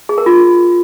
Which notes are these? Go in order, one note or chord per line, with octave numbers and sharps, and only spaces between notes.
G#4
A#4
F4